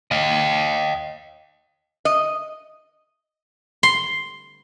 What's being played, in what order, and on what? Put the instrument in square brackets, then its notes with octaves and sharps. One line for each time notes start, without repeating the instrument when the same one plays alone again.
[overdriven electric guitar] D#5 F5
[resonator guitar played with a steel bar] D#5
[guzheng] C6